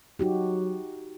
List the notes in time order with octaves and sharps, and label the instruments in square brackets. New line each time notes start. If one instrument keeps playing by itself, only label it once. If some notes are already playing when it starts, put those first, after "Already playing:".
[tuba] F#3 [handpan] D#4 F#4 G4